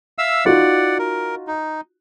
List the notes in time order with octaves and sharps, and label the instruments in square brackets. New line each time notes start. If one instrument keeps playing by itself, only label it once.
[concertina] E5 F5 E6
[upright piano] D#4 F4 F#4 [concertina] D5 F#5
[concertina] A#4
D#4